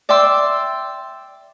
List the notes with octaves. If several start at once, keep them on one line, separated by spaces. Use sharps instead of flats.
D5 E5 G5 C6 E6